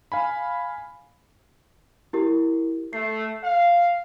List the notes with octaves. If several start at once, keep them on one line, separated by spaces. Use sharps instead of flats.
F5 G#5 B5
E4 G4 A#4
A3 C7
F5